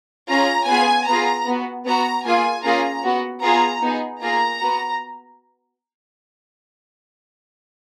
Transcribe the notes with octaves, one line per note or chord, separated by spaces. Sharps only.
C#4 F4 G#4 A#5
B3 F4 G#4 G#5
B3 F4 G#4 A#5
B3 F#4
B3 F#4 A#5
A#3 F4 G#4 G#5
A#3 C#4 F4 G#4 A#5
B3 F#4
B3 F4 G#4 A#5
B3 D#4 G#4
A#3 F4 G#4 A#5
B3 F#4